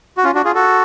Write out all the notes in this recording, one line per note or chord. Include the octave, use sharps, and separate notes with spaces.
F#4
C#4 F4
D4 F#4
F4 G#4
F#4 A4